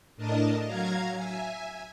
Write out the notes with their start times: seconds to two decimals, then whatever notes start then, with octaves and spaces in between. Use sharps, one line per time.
0.17 A2 D4 A#4 D#5 A5
0.65 F#3 F5 A#5 G#6
1.15 E5 G#5